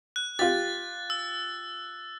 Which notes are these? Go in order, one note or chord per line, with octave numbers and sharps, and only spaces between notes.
F#6
F4 G4 A6
E6